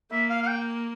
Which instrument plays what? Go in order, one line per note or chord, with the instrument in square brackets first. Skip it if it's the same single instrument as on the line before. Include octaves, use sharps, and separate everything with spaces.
[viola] A#3 [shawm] E5
[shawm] F5
F5
G5